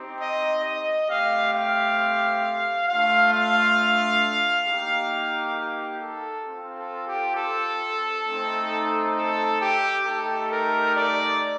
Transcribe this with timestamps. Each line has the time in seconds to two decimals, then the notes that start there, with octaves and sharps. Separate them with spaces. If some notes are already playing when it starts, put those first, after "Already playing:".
Already playing: C4 D#4 G4
0.19 D#5
0.64 D#5
1.08 A3 C4 G4 F5
1.53 F5
2.88 A3 D4 F4 F5
3.32 F5
4.67 A#3 D#4 G4
5.57 G4
6.01 A4
6.46 C4 F4
6.77 A4
7.06 G4
7.36 A4
8.25 A3 C4 D#4
9.15 A4
9.60 G4
10.04 A3 D#4 G4 A4
10.49 A#4
10.95 D5